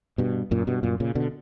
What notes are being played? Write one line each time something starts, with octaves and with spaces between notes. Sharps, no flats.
G2 B2
F#2 A#2
G2 B2
F#2 A#2
A#2 C#3
B2 D3